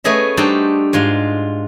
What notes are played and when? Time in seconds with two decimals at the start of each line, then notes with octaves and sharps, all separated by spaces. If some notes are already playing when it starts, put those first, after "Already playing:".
0.04 A3 B3 C#4 G#4 D#5 E5
0.37 G3 D4 D#4 F#4 A4 C5
0.93 G#2 G#3 F4